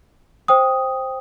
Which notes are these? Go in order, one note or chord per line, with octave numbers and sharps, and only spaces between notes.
C5 G5 D#6